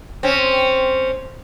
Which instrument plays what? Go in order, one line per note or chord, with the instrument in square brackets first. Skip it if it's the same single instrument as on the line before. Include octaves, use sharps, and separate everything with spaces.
[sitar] C4 C#4